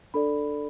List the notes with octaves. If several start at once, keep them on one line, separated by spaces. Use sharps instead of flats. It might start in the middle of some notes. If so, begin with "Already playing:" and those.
D4 A4 D5 B5